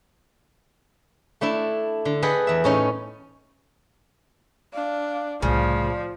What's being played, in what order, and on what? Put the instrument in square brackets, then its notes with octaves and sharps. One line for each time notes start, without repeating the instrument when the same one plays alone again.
[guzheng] A3 D4 E4
D3
G#4 A4 B4 D#5 F#5 G5
E2 E5
A2 C#4 D#4
[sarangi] D4 [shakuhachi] F5
[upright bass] C2 A2 [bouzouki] C#3 [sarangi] F3 [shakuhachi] D5